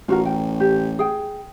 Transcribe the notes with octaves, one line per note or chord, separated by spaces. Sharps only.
A1 F4 F#4 A#4
G5
G4
G#4 G5